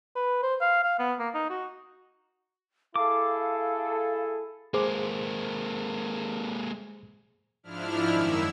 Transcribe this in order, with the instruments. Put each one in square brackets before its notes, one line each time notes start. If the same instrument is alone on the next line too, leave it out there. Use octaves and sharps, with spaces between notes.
[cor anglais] B4
C5
F5
F5
B3
A#3
D#4
F#4
[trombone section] E4 G#4 A4 [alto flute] F5 [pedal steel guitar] D6
[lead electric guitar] G#3 A#3 [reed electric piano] G#4 C5 D6
[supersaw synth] G#2 F3 D4 E4 F6
F#2 D#3 E4 E6